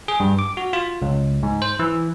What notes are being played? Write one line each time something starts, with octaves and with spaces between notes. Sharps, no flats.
G#4
G2
D6
F#4
F4
C#2
G#2
C5
E3